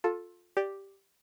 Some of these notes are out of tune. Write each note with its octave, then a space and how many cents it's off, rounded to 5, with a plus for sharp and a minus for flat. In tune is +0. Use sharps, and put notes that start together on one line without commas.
F4 +20 A4 +0
G4 +0 D5 +0